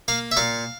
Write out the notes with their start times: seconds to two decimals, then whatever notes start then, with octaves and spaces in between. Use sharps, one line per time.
0.08 A#3 F5
0.31 E5
0.37 A#2 F5